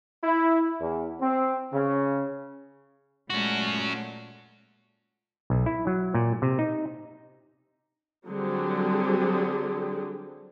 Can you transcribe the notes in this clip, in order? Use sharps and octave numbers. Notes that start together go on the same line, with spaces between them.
E4
E2
C4
C#3
A#2 G#3 A3 C#4 F#4
B1
E4
F#3
A#2
C3
D#4
D3 F#3 G3 C4 G4 G#4